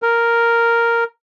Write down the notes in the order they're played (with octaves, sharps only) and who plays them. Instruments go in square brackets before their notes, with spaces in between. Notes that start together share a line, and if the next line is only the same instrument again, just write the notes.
[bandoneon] A#4